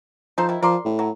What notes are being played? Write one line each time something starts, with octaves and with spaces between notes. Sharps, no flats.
F3 D#4 A4 C5
D#3 E4
F3 A#4 D5 C6
A2
F#3